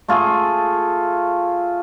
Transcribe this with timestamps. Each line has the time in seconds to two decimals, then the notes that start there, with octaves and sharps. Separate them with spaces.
0.08 A3 F4 G#4 A4